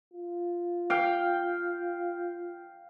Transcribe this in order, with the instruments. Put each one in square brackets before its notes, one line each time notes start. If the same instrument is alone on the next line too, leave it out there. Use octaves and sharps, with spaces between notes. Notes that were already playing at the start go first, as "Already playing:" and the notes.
[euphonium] F4
[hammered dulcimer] F5 G5